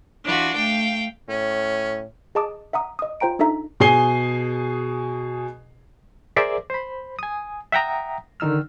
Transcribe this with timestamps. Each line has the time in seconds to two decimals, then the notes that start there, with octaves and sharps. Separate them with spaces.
0.24 E3 D4 F4 F#4
0.55 A3 F5 G5
1.29 A2 C#4
2.35 G#4 D#5 A5 D6 D#6
2.73 E5 F#5 A#5 D#6
2.99 D#5 D#6
3.20 F4 C5 G5 A#5 D7
3.39 D4 D#4 A4 E5 A#5
3.80 B2 G#4 G#5 C7 G7
6.36 G#4 A#4 C5 D5 E5 D6
6.70 C5 B5
7.19 G#5 D#6
7.72 E5 F#5 G5 A#5 D#6
8.40 D3 D#3 D#4 E6 F6